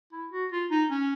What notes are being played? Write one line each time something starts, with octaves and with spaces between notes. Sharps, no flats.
E4
F#4
F4
D#4
C#4